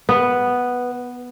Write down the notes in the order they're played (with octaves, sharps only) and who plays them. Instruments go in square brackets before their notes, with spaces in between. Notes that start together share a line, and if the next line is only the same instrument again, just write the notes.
[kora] B3 [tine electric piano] B4